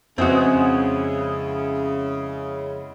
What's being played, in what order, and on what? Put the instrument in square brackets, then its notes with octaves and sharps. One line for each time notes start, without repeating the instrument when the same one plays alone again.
[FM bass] F2 [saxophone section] C#3 [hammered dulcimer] G#3 B3 E4 [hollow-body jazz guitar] C4 F#4